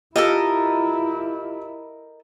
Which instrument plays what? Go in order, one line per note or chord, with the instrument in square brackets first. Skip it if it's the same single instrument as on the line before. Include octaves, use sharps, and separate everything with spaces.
[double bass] E4 [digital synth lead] F4 [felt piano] G4 [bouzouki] A4 A#4 D#5